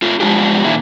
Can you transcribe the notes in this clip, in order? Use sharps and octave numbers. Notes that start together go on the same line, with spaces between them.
A3 F4
F3 G3 G#3 D4 F4 G4
A#2 D#3 E4